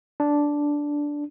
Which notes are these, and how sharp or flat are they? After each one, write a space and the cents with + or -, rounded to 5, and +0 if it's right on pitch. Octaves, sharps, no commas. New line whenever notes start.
D4 -5